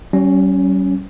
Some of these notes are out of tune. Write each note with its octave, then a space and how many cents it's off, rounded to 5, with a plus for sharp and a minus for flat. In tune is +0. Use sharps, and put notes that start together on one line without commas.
G3 -45 C#4 +0